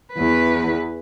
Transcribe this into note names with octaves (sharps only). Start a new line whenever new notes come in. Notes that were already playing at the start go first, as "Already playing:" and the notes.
E2 B4